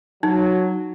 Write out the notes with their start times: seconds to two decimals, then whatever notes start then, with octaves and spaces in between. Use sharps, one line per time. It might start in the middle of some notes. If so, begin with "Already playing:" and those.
0.23 F#3 D#4